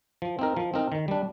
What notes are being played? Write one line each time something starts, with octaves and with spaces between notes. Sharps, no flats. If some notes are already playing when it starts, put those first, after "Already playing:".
F3
C4 D#4 A#4
F3
C4 D#4 A#4
D#3
G3 D4